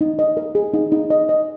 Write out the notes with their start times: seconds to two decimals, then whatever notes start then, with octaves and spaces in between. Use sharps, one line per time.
0.01 D#4
0.19 D#5
0.37 A#4
0.55 G#4
0.74 D#4
0.92 D#4
1.10 D#5
1.29 D#5